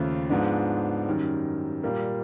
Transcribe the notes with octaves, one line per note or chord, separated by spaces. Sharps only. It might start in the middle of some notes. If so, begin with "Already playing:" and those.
Already playing: D#2 C#3 F3 A3
G#2 F3 G#3 B3 D4
F#2 D#3 G3
A#2 G3 A#3